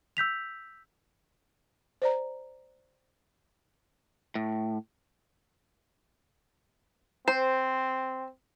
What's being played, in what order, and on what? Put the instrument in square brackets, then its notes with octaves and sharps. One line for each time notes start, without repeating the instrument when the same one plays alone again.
[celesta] E6 G6 B6 F7
[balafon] C5 D5 A#5
[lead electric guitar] A2
[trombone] C4 [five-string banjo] C5